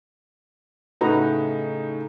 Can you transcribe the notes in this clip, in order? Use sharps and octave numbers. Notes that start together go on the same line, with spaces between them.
A2 C#3 D#4 F#4 B4 A#5